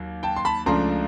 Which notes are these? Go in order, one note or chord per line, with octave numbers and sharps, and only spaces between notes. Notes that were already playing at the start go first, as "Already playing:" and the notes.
Already playing: D#2 F#3
G5 A5
C6
A5 B5
C#2 C#3 F3 A3 D4 A#5 C6